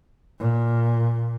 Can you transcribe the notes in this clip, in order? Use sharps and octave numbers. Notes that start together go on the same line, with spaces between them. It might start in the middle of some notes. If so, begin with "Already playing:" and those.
A#2